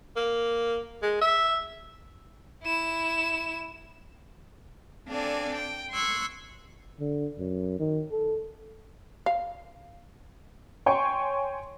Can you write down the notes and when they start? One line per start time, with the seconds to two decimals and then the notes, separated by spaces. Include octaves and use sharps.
0.16 A#3
1.02 G#3
1.21 E5
2.63 E4 E7
5.08 C4 D4 A4 D5 F5 G#5
5.55 G5
5.91 C6 C#6 E6 F#6 G#6
7.00 D3
7.39 F#2
7.80 D#3
8.12 A4
9.26 F5
10.86 C#5 G5 G#5 C6 C#6